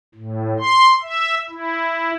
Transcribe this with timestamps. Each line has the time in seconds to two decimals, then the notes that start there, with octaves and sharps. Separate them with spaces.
0.15 A2
0.59 C6
1.03 E5
1.49 E4